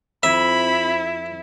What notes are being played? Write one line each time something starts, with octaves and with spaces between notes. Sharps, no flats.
F2 E4 E5 B5